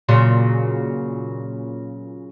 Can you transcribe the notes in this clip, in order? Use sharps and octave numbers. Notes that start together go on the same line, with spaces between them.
A#2 C#3 F#3